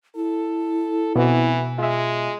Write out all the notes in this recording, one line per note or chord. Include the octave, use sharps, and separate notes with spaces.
E4 A4
B2 E3 B3 C4 F#4
G#3 F4 E5